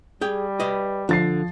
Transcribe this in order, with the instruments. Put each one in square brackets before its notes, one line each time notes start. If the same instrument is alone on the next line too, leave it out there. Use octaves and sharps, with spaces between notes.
[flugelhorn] G3 [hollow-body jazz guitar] G#4 G5
[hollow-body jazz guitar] B4 D#5
[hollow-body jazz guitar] D3 [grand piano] F3 A6 C7